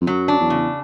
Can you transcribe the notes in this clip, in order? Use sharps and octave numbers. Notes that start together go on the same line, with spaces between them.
F2
F#2 F#3
D4
E2
C#3